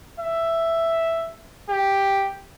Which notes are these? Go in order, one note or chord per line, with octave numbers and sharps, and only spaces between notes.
E5
G4